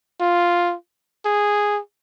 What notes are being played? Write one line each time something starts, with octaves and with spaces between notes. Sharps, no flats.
F4
G#4